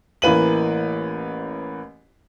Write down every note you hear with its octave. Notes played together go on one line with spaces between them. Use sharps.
A1 E3 A#3 B4 D#7 F#7